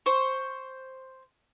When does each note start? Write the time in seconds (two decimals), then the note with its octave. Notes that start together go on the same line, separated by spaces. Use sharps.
0.06 C5 C#6